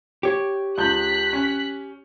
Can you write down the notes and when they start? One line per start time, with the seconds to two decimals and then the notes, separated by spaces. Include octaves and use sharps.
0.23 G4 C#5
0.78 C#2 A5 F#6 G6 B6
1.33 C#4